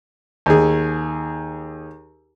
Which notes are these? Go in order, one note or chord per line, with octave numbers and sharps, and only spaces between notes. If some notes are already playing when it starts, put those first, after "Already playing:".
D#2 G#4